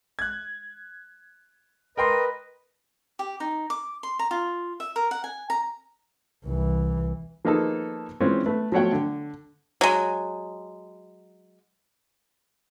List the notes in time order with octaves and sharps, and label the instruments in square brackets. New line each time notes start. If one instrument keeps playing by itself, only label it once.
[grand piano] F#6 G#6
[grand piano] A#4 G5 C6 [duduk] B4 [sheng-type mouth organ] D#5
[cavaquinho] G4
D#4
D6
C6
A#5
F4
E5
A#4
F#5
G#5
A#5
[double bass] C2 E3
[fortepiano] F3 A#3 B3 D#4 G#4 A4
E3 G#3 C4 C#4 F4
A3 B4
F3 F#3 A3 C#5 F#5 G5
D3
[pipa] F#3 G#3